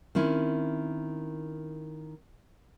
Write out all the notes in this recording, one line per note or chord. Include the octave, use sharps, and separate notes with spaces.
D#3 C4 C#4 E4